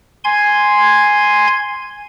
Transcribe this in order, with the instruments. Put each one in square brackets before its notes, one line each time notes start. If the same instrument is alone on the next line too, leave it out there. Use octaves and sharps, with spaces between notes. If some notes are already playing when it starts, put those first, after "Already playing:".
[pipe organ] G#5 C6 G#6